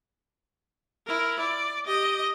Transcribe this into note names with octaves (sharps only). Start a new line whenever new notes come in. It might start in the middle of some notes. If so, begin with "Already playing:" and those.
E4 A#4
D5
G4 D#5